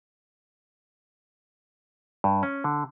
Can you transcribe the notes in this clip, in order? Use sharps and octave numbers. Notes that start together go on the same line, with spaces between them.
G2
C#4
D3